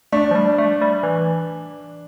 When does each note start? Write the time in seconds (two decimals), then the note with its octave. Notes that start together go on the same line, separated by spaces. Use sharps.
0.12 A3 D4
0.31 F3
0.35 G3
0.58 A3
0.81 G3
1.03 E3